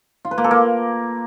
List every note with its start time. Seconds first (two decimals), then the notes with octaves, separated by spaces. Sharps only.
0.25 F4
0.31 B4
0.38 A#3
0.44 A4
0.51 A#3